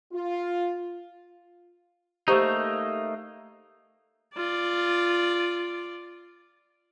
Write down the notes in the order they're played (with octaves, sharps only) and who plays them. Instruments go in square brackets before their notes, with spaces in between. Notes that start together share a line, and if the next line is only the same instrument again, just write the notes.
[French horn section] F4
[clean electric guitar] A3 A#3 D#4 [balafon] G4 C5 C#6
[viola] F4 D5